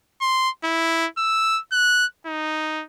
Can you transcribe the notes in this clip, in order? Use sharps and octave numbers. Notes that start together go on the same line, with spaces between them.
C6
E4
E6
F#6
D#4